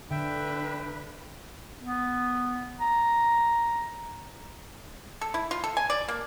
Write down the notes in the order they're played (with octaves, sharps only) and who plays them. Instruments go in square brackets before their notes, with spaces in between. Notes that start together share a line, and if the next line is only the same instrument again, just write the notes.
[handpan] D3 [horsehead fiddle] D4 B4 [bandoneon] E5 G5
[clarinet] B3
A#5
[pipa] A4
E4
F4
A4
G#5
D5
A#3